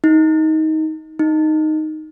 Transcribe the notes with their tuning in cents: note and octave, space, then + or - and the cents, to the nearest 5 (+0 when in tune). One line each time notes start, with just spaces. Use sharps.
D#4 +20
D#4 -5